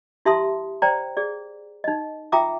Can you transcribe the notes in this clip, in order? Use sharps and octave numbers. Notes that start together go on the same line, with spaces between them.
E4 G4 E5 A5 C6 D#6
C5 D5 G5 A#5
G#4 D5
D#4 D#5
F4 E5 G5 A#5 D6 D#6